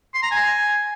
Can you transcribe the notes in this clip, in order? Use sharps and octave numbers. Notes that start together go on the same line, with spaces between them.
C6
A#5
G#5